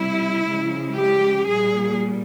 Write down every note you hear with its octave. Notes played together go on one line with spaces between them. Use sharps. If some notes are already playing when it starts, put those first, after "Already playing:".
Already playing: C3 G3 E4
C#3 F3 G#3
G4
A#2 G3 G#4